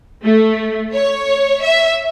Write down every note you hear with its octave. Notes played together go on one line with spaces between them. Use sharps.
A3
C#5
E5